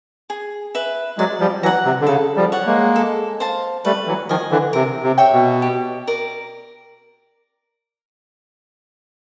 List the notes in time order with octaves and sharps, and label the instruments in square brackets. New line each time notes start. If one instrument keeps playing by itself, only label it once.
[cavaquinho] G#4
B4 E5
[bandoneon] F#3 G#3 [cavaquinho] D5
[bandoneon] F3 G3
[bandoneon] E3 F#3 [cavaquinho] F#5 A#5
[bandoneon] C3
D3
[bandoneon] C#3 [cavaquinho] A4
[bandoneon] F3 G3
[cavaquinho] C#5 F#5
[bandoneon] G#3 A#3
[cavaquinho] A4
C5 F5 A5
[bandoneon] G3 A3 [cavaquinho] B4
[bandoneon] E3 F#3
[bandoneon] D#3 F3 [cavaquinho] D#5 G#5
[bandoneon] D3 E3
[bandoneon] C3 [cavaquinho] A#4
[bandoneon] C3
[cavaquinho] C#5 E5 G5
[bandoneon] B2
[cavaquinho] G4
A#4 D5